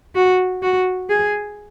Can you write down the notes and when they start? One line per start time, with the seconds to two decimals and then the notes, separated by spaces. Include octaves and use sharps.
0.15 F#4
0.62 F#4
1.09 G#4